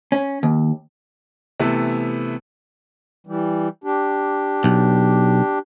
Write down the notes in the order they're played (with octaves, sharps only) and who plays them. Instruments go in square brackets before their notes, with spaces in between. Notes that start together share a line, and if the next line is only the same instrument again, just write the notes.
[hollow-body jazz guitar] C#4
D#2
[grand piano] C3 E3 A3 B3
[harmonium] E3 G3
D4 G4
[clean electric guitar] B1